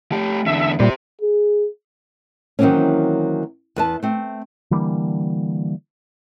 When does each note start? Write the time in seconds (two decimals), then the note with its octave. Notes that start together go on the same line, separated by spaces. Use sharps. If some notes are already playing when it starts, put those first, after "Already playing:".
0.12 A3 G4
0.46 E2 D3 E5
0.80 A#2 G3 G4 C5
1.21 G#4
2.59 D#3 E3 F#3 A#3 C4 C#4
3.76 E2 B4 A5
4.03 A3 C4
4.71 D3 E3 G3 A#3